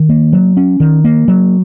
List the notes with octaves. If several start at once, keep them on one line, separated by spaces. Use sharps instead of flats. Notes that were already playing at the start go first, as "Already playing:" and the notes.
Already playing: D#3
A#3
F#3
C#4
D#3
A#3
F#3